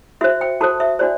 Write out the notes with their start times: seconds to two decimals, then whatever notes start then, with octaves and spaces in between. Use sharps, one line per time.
0.21 F#4 C5 E5
0.41 G5
0.61 F#4 A4 C5 A5
0.80 E5
0.99 D4 F#4 C5 D5